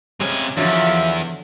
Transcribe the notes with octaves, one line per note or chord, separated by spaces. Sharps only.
C3 G#3 C4 C#4 G#5
E2 D3 F3 F#3 F4 C#5 E5